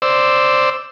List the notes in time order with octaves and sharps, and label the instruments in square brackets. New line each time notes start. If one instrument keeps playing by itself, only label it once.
[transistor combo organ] C5 D5 E6